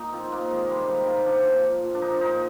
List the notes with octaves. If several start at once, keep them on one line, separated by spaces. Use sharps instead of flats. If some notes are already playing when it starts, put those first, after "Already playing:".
Already playing: A#2 A#3 D#4
F3 C4
A#2 A#3
D#3 G#3
C3 G3
D#3 G#3
C3 A#3
F3 D4
A#2
F3
A#2
D4
F3 D#4
A#2 D#4